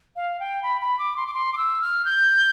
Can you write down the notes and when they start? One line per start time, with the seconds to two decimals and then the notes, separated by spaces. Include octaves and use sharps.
0.16 F5
0.40 G5
0.63 B5
0.81 B5
0.99 D6
1.17 C6
1.27 D6
1.34 C6
1.53 D6
1.57 E6
1.81 F6
2.05 G6